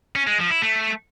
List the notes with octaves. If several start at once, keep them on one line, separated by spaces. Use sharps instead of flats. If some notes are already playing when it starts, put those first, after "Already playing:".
C#4
G#3
F3
E4
A3